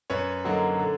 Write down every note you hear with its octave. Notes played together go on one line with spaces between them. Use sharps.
F#2 B4 C#5
D3 F#3 A#3 D#4
D3